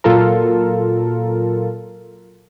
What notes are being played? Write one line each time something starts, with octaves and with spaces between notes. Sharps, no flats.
A#2 F#3 F4 A4 A#4